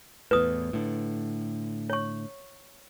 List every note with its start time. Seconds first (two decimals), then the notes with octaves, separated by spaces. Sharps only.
0.31 E2 A2 B4 D#6
0.73 A2 D3
1.90 C#5 C#6